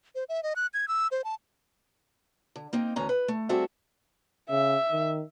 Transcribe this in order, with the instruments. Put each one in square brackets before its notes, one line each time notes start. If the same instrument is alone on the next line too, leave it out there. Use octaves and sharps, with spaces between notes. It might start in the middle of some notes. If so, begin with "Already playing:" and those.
[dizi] C5
E5
D#5
F#6
G#6
E6
C5
A5
[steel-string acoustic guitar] D3
A#3 C4 D#4
D2 E3 C#4 B4 A#5
B4
A3
G3 C4 F#4 G#4 A4 E5
[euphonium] C#3 [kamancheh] E5
[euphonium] D#3